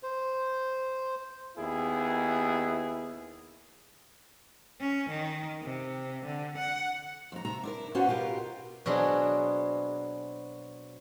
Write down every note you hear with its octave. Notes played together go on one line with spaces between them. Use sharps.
C5
D#2 B3 E4 G#4
C#4
D#3
C3
D3
F#5
F2 A#5
C3 E5 A#5
D4 E4 A#4
B3 C#4 F4 F#4 C5
B2 F4 G4 A#4
B2 F#3 C4 D4 G#4